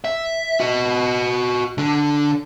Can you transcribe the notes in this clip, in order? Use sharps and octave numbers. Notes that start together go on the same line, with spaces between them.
E5
F#4 D#5
D3 D4